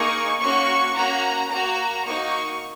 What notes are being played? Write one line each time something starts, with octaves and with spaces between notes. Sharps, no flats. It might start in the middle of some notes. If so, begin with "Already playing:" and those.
Already playing: A#3 D#4 G#4 C#6
A#3 C#4 F#4 C#6
A#3 C#4 F#4 A#5
A#3 F#4 A#5
A#3 D#4 F#4 C#6